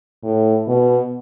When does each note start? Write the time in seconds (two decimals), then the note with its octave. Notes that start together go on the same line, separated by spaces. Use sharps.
0.23 A2
0.67 B2